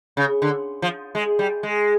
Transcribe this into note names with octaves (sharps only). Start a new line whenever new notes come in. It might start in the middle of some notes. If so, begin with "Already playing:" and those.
C#3
D3
F3
G#3
G3
G#3